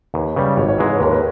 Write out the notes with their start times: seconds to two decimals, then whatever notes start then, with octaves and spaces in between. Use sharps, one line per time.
0.14 D#2 B4
0.36 C#3 G3 B4
0.57 G#1 C#5
0.68 C#5
0.78 G#2 E3 G#3 B4
0.89 C#5
0.97 B4
1.01 D#2 A#4
1.10 B4